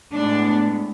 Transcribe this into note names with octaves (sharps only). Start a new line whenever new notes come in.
A2 G#3 B3 D4